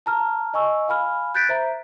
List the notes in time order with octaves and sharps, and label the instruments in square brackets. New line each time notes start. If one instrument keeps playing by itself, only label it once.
[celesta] A5 A#5 F6
D#5 G#5 C#6 E6
F5 G#5 B5 F6
F#6 G6 A6 B6 D7
C5 E5 A#5